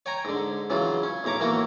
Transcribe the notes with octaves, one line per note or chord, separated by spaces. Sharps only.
C#5 G5 G#5 A#5
G#2 D3
C#3 E3 F#3 F4
C#4
B1 A2 C#5 A#5 D6
E3 A3 A#3 F#4